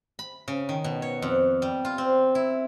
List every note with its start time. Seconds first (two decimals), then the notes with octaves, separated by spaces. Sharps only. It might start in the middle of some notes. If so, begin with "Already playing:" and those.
0.19 B5
0.48 C#3
0.69 D#3
0.84 B2
1.02 C#5
1.22 F2
1.62 G3
1.85 F4
1.98 C4
2.35 E4